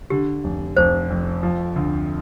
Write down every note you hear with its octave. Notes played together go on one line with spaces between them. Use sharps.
D3 G4
F1
F1 C5
F2
F3
D2